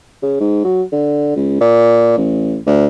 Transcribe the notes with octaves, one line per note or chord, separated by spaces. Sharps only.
C#3
G#2
F#3
D3
C#2
A#2
A1
D2